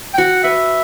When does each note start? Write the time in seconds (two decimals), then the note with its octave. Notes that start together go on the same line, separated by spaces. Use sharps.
0.14 G5
0.18 F#4 F#5
0.44 B4 E5